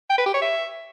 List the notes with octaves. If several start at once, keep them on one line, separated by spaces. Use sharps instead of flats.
G5
B4
G4
C#5
E5